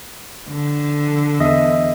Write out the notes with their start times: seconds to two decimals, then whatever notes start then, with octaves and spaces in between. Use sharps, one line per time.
0.50 D3
1.40 E2 D#5 E5